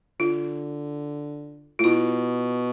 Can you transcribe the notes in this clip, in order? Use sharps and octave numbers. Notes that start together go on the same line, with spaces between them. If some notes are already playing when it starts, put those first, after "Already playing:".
D3 F4
A2 F4
B2 E4